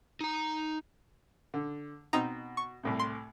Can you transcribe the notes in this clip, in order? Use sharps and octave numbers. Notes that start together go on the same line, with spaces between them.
D#4 A#5
D3
B2 C4 D#4 A#5
C#6
C2 A2 C3
C6